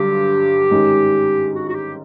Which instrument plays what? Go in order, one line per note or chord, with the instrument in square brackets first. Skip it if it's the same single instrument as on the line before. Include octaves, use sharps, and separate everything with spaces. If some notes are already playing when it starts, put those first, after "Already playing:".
Already playing: [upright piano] G2 D3 F#3 [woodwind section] G4
[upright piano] G#2 D#3 G#3 C#4
[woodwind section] F#4
F#4
G4